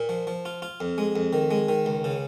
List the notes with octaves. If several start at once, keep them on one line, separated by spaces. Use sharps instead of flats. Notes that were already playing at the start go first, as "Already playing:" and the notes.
Already playing: A#2
F3
F3
F4
F4
F2
G#3
F2
D#3
G#3
D#3
C#2
C#3